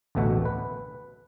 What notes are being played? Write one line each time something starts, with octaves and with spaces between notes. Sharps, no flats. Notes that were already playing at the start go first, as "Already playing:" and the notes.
A1 D2 B2 A3 E5 F#5
B4